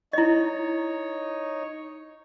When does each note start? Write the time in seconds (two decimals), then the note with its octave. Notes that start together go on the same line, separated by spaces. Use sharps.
0.13 D#4 E4 C#5 D#5